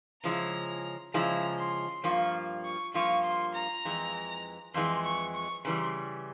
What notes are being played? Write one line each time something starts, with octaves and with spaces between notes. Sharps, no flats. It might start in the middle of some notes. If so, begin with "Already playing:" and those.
C#3 F3 G#3 E4 A#5
C#3 F3 G#3 E4 A#5
C6
G2 F3 A#3 F4 C#6
C#6
G2 F3 A#3 F4 C#6
C6
A#5
F2 E3 G#3
F2 E3 G#3 C6
C#6
C#6
C#3 E3 G3 C6